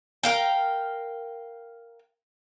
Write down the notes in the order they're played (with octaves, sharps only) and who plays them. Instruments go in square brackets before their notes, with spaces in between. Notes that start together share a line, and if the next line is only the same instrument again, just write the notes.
[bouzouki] A#4 F5 G5